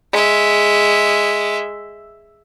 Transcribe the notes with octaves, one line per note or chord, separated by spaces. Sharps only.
G#3 E5